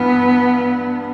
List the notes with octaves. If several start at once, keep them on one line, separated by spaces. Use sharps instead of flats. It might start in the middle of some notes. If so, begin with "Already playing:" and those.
Already playing: G2 E3 B3